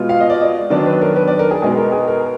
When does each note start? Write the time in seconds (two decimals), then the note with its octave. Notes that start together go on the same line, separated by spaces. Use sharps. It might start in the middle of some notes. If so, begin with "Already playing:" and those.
Already playing: B2 G#3 B3 F4
0.09 F5
0.20 D#5
0.30 D5
0.41 D#5
0.70 D#3 F#3 B3 D4 D5
0.86 B4
1.02 A#4
1.16 B4
1.28 D5
1.39 A#4
1.51 G#4
1.62 B2 G#3 B3 D#4 G#4
1.77 A#4
1.92 G#4
2.08 A#4